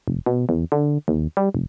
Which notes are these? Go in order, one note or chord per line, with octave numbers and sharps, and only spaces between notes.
F1
B2
E2
D3
D#2
G3
F1